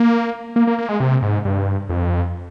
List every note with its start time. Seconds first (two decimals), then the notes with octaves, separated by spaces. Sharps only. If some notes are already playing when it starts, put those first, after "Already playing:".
Already playing: A#3
0.56 A#3
0.67 A#3
0.78 A#3
0.89 G#3
1.00 C3
1.22 G#2
1.45 G2
1.89 F2